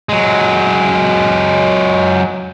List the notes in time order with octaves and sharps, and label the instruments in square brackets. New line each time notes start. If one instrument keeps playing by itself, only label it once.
[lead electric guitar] F#3 G#3